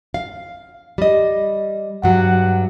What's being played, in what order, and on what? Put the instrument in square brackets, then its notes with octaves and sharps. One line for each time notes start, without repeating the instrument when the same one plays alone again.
[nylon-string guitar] F5
G3 D#5
[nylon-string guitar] G2 F#3 [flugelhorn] F#5